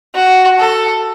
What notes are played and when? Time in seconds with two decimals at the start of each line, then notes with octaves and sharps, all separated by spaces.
0.15 F#4
0.58 A4